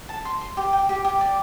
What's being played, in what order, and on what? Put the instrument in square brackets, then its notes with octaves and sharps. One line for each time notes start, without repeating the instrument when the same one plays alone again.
[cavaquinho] A5
C6
C6
G4
G5
G4
G4
D5